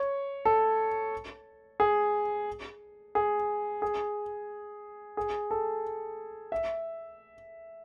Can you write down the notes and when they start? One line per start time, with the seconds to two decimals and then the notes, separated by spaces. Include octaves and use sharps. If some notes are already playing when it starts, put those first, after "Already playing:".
Already playing: C#5
0.45 A4
1.80 G#4
3.15 G#4
3.82 G#4
5.17 G#4
5.51 A4
6.52 E5